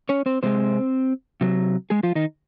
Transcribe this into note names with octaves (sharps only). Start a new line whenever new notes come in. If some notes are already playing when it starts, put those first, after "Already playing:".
C#4 C#5
C4 C5
C3 F3 G#3 C4 C5
C3 F#3
G#3 G#4
F3 F4
D#3 D#4